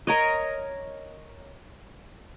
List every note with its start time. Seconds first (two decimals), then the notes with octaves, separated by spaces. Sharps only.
0.07 A#4 C#5 D#5